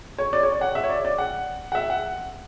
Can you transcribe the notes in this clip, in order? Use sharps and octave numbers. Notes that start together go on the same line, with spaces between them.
C#5
D5
C#5
D5
F#5
E5
C#5
D5
D5
F#5
F#5
E5
F#5